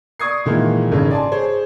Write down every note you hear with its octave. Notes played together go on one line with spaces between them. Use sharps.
D5 C#6 D#6 G#6 C7
A#2 D#3 E3 G#3 A#3
G#1 C#3
D5 G#5 A5 C6
G#4 C5 C#5